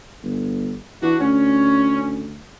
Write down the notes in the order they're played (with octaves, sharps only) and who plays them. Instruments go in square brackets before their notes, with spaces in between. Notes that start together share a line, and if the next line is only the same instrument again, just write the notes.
[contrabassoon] G1
[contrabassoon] E3 [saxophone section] D4 F#4
[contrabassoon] D2 [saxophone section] C#4